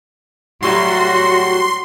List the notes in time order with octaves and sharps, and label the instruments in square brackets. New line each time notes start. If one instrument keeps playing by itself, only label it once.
[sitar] A2 F#3 G3 [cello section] F#4 [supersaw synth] C6